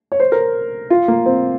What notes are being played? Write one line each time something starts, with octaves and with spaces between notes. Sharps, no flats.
C#5
C5
A#4
F4
A#3
C4